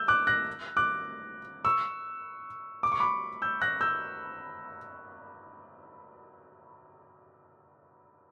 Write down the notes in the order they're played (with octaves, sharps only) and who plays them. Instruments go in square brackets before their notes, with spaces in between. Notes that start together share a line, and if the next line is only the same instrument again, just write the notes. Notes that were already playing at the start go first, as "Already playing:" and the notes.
Already playing: [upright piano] E6 G6
D6 F#6
F#6 A#6
D6 F#6
C#6 E6
D6
C#6
B5 D6
E6 G6
F#6 A#6
E6 G6